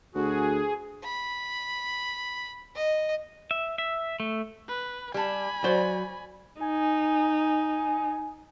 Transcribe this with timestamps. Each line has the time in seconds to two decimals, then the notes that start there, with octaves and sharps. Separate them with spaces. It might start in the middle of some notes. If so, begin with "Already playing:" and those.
0.15 D2 F#4 G#4
1.04 B5
2.76 D#5
3.51 E5
3.78 E5
4.20 A3
4.68 B4
5.14 G3 G#5 A5 B5
5.64 F#3 C5 D5
6.61 D#4 G#5